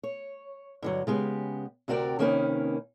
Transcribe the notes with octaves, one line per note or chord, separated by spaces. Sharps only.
C#5
G2 D3 F#3
C#3 G#3 B3 G4
D2 C3 F#4 A#4 D5 G5
C3 D#3 A#3 C#4 D#4 B4